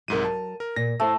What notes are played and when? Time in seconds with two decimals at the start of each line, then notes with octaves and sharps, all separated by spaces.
0.08 C2 G#2 F#3 A#4 D#7
0.25 A5
0.60 A#4
0.76 A#2 A#6
1.00 A2 A3 C5